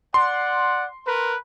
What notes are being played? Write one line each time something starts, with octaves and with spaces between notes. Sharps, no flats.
D5 F#5 C6
A#4 B4